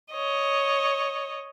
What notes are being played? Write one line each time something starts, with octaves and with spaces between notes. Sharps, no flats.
C#5 D#5